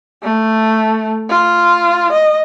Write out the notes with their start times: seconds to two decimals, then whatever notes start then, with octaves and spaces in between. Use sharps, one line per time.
0.23 A3
1.29 F4
2.13 D#5